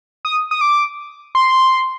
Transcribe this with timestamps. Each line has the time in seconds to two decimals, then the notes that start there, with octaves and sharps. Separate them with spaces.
0.25 D#6
0.51 D#6
0.61 D6
1.35 C6